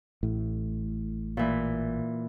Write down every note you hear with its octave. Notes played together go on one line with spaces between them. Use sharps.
A1 A2
A#2 E3